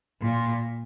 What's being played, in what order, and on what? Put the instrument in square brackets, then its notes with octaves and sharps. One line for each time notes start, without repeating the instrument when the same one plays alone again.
[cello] A#2